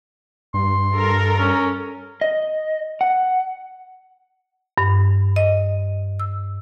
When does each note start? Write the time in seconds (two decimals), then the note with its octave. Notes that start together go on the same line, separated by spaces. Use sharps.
0.54 G2 C6
0.93 A4 A#4
1.39 C#4
2.21 D#5
3.01 F#5
4.78 G2
5.36 D#5
6.20 E6